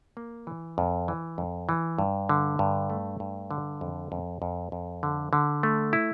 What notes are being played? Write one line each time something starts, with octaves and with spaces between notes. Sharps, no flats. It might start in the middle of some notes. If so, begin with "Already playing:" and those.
A#3
E3
F2
E3
F2
E3
G2
D3
G2
A3
G2
D3
F2
F2
F2
F2
D3
D3
A3
E4